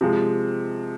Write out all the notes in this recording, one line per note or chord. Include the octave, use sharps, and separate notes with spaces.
C3 F3 G#3